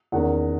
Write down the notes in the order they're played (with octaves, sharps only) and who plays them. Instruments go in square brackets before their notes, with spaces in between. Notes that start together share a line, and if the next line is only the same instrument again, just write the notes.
[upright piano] E2 D#3 A#3 C#4 F#5